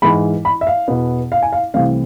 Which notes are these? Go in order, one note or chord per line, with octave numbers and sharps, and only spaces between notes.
G#2 E3 G#3 B5
B5
E5
F5
E2 B2 B3
F5
G#5
F5
C2 C3 E3 A3 C4 F5